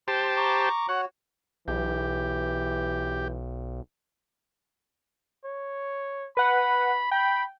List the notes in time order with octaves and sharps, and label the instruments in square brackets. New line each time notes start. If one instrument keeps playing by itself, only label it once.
[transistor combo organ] G4 C5 A5 [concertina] C6
[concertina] A#5 C#6 D6
[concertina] F#4 C#5 [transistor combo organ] F#5
[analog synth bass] B1 [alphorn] E3 [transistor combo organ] G4
[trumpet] C#5
[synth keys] B4 F#5 [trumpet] B5
[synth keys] G5 [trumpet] B5